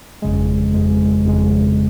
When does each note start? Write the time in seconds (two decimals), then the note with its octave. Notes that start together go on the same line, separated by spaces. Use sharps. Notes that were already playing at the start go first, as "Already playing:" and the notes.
0.22 G1 F2 C#3 G#3
0.73 G1 F2 C#3 G#3
1.24 G1 F2 C#3 G#3